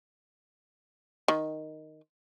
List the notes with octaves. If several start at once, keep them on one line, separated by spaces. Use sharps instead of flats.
D#3